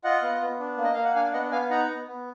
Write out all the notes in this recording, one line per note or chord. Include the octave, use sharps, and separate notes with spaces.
F4 D#5 F#5
B3
B3
D4
A#3
D#5
A#3 F5
F#5
D4 F5 G#5
B3 D#5 F#5
B3 F5 G#5
D#4 F#5 A#5
B3
B3